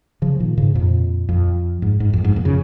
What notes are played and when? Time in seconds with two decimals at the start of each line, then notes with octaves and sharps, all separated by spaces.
0.22 C#3 F3
0.40 A#2 D#3
0.57 G#2 C#3
0.75 F2 A#2
1.29 F2
1.82 G#2
2.00 G#2
2.13 F2
2.24 G#2
2.36 F2 A#2
2.45 C#3